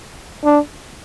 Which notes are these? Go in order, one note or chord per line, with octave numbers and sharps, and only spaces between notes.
D4